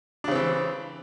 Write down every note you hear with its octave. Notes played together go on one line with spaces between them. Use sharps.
C#3 E3 C4 D4